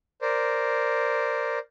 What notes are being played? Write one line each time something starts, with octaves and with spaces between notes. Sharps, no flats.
A#4 C5 D5